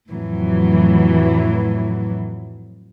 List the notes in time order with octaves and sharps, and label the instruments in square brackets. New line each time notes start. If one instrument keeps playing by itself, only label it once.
[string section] F2 A2 E3 F#3